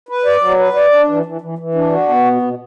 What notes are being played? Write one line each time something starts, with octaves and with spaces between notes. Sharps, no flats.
B4
D5
F#3
B4
D5
D4
E3
E3
E3
E3
D4
F#4
B3
B2
B2